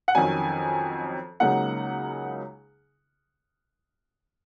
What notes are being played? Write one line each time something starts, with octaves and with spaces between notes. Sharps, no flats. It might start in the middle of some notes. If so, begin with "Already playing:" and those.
F#5
F2 D#3 F#3 C#4 G#5
C#2 C#3 F#3 A#3 D#4 F#5